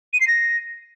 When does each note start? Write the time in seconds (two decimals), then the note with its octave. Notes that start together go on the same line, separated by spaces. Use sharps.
0.13 D#7
0.21 C7
0.28 A#6